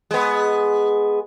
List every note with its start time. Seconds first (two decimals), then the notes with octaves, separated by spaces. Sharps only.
0.11 G#3 B3